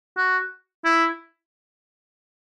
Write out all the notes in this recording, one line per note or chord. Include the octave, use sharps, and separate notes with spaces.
F#4
E4